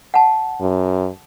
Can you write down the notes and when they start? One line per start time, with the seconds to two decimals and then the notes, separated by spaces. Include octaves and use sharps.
0.14 F#5 A5
0.60 F#2